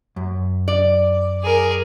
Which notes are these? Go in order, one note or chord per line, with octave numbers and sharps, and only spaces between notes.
F#2
D5
G#4 A#4